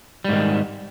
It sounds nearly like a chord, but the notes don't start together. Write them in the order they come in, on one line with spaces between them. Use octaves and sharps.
G3 G#2 D#3